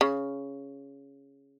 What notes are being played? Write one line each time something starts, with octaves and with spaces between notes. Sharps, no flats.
C#3